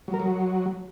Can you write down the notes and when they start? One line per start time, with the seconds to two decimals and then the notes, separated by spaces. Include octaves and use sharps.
0.08 F#3
0.14 A#4
0.20 F#3